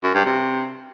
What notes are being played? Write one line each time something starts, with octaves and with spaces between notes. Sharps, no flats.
F#2
G2
C3